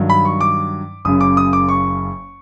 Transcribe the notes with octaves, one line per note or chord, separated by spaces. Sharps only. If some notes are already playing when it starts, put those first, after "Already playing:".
Already playing: G2 D#3 F#3
B5
C#6
D6
F#1 F#2 C#3 D#6
D6
D#6
D6
C#6